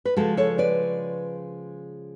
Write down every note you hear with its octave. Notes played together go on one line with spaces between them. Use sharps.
B4
C#3 F3 G#3 F#4 A4
A4 C#5
B4 D5